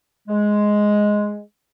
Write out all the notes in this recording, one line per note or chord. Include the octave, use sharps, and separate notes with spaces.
G#3